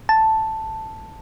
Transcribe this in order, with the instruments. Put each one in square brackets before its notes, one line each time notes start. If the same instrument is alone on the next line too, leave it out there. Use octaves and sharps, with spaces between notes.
[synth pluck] A5